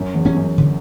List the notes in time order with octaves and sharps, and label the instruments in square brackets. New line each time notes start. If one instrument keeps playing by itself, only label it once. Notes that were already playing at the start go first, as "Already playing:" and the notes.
Already playing: [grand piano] F#2
E2
[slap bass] G3 C#4
[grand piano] F#2
[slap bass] D3